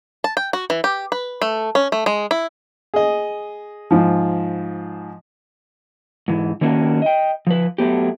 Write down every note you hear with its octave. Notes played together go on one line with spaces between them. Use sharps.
A5
G5
F#4
E3
G4
B4
A3
C#4
A3
G#3
E4
G#4 D#5
G#2 F3
G#2 E3
D#3 A#3 C#4 D4 F#4 A#4
D#5 G5
F3 B4
F#3 A3 B3 G4